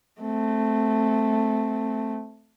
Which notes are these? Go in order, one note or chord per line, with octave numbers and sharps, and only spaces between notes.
A3 C4